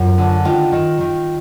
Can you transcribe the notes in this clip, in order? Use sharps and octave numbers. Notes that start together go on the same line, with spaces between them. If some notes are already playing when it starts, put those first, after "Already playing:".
Already playing: F#2 F4
D3
D#3 F4
D#3
D#3